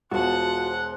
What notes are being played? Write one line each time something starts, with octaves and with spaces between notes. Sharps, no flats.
E1 F4 F#4 C5 F#5 A5 C6 F#6